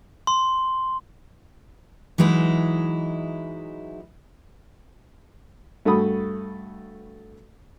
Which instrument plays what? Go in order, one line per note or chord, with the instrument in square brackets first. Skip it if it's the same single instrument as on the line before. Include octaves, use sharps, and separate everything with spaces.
[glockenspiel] C6
[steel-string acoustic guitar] E3 F#3 G#3 D#4 E4
[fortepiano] G2 A3 F#4 B5 D#6